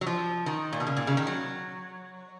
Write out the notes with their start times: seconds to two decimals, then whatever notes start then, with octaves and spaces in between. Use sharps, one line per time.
0.01 F#3
0.07 F3
0.46 D#3
0.73 A#2
0.80 B2
0.87 C#3
0.97 A#2
1.07 C#3
1.17 D#3
1.27 F#3